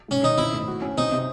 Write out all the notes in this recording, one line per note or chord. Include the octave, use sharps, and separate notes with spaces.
G#2 C#4
D#3 D#4
C4 E4
A2
F#4
C#4
C4 D#4
C3